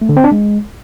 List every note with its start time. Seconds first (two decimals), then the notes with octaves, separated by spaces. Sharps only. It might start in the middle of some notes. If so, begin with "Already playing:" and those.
0.02 A3
0.09 D3
0.17 C4
0.24 D4
0.32 G#3